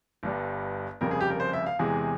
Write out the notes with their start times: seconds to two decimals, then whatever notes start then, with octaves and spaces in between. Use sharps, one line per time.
0.23 G1 G2 G3
1.01 F1 F2 C#3 G3 A#4
1.11 G#4
1.21 G4
1.30 A#4
1.40 C5
1.53 E5
1.66 F5
1.79 E2 C3 E3 G#3 G#4